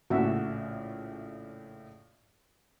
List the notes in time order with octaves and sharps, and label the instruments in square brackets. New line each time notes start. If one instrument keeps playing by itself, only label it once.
[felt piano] A#1 A2 C#3 [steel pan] F#4 E5